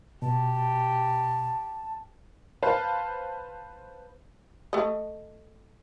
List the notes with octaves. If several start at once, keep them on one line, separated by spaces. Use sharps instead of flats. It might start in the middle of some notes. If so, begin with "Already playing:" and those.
B2 G4 A5
B4 C5 F5 A5
A3 D#5